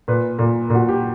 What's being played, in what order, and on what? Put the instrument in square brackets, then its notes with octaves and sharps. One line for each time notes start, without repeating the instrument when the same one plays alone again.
[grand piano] A#2 B4
A#2
A#2 F#4
G4